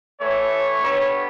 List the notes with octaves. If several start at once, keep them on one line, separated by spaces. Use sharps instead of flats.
A2 E3 A3 C#5
D3 G3 B3